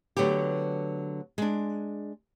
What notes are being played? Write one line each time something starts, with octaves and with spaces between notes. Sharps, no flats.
D3 F#3 A3 B3 G4
G#3 D4